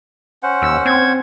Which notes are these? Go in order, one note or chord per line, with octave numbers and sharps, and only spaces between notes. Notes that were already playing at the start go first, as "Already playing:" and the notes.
C#4 C5 F#5
D#2 E6
C4 G#6